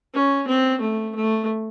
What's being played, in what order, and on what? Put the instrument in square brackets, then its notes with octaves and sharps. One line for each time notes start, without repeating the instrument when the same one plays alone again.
[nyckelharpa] C#4
C4
A3
A3